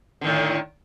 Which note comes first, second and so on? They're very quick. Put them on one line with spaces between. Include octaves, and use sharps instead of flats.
D3 D#3 A2